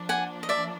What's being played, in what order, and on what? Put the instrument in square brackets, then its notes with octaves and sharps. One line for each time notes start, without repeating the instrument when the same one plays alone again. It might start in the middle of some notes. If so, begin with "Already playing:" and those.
Already playing: [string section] F3 A#3 D4
[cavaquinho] F#5 G#5
D#5
D5 E5